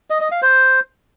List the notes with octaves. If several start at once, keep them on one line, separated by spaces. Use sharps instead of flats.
D#5
D#5
F5
C5